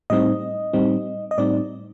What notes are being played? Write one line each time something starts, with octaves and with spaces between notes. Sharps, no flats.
A2 G3 C4 D#4 D#5
A2 G3 C4 D#4
D#5
A2 G3 C4 D#4 D5